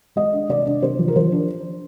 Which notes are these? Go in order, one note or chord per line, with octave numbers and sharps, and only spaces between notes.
G#3 D#5
D4
C3 D5
D4
C3 C5
F3
A#4
F3 C5
D4